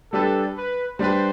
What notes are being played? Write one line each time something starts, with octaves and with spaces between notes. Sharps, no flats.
G3 D4 G4 A4 B4
B4
G3 D4 G4 B4 C5